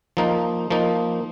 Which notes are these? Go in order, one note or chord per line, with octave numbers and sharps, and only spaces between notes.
F3 A#3 D#4
F3 A#3 D#4